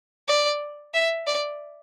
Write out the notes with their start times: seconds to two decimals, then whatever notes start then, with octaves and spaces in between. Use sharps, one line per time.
0.28 D5
0.94 E5
1.27 D5